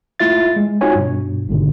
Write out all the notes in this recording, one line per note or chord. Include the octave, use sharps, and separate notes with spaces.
A3 E4 F4 E5 A6
G#3
C4 D#4 F4 F#4 C#5 G#5
G2 B2
G#1 G#2 B2 D3